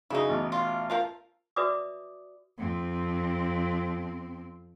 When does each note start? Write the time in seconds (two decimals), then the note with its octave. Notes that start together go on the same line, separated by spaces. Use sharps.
0.10 C#3 F#3 D#4 E4 G#4
0.29 A1 B2
0.52 F4
0.90 F3 F4 A#4 F5
1.56 F#4 B4 D5 E5 D6 D#6
2.58 F2 C4